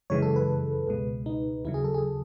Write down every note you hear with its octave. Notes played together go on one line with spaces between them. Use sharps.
F#2 C#3 E3 G#3 C#5
A4
B4
C#2 B2 G#3
D#4
D#2 C#3 F#3 E4
G#4
A4
G#4